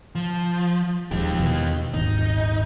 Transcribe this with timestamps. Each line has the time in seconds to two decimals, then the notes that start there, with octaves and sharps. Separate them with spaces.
0.15 F3
1.11 D#1 F3 G#3 D#4 G4
1.38 E2 B2 D#3
1.94 D#1 G#1 D#4